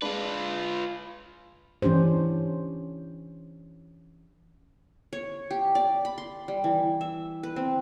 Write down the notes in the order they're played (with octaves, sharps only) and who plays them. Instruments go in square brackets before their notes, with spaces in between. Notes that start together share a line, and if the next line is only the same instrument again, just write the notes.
[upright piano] G#3 D4 [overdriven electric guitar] F4 B4
[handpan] E3 C#4 D4 G4 C5
[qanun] C#5
G4
D5
B5
C6
G3
E3
E5
B4
C4